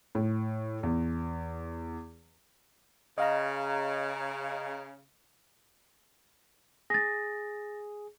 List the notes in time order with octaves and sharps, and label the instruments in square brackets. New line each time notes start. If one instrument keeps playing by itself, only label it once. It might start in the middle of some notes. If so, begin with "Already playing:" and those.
[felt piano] A2
E2
[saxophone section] C#3 [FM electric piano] D#5 F5 A#5
[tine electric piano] G#4 [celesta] A6 A#6